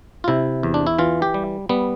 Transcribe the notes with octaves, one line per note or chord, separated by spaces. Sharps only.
F4
C3 E4
E2
D4
E4
E3 F4
G4
G3
G3 B3